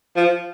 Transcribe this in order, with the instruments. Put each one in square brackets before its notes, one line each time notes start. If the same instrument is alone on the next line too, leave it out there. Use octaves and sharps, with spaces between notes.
[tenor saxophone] F3